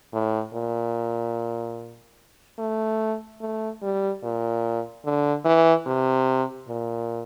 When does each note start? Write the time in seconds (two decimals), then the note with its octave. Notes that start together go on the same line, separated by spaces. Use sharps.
0.13 A2
0.54 A#2
2.59 A3
3.41 A3
3.82 G3
4.23 A#2
5.05 D3
5.45 E3
5.87 C3
6.68 A#2